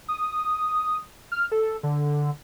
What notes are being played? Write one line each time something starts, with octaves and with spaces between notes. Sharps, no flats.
D#6
F6
A4
D3